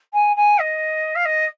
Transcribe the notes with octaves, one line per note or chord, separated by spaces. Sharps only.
G#5
G#5
D#5
F5
D#5